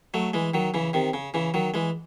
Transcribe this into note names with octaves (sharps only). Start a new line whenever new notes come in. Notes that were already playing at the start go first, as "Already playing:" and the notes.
F#3 A3
E3 G#3
D#3 F#3
C#3 E3
C3 D#3
C#3
C#3 E3
D#3 F#3
E3 G#3